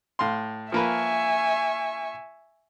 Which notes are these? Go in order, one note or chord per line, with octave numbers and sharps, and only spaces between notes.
A2 F5 C6
F3 A#3 B4 E5 G#5 C#6